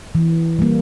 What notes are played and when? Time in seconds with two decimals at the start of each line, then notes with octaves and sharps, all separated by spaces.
0.15 E3
0.59 G3 A#3